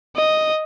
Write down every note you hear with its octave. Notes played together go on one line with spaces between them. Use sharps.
D#5